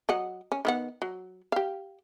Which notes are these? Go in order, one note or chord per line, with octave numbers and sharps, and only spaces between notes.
F#3 D#5 F#5
C#4
D#3 B3 F#5
F#3
G4 F5